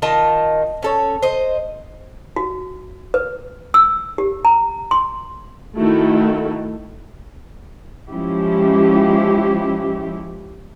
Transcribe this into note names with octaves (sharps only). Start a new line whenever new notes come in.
D#3 F4 D#5 A5
C#4 A4 C#5
C5 D#5
F#4
B4
E6
G4
A#5
C6
D#3 A3 E4 F#4 A4
F3 G#3 C#4 E4 G4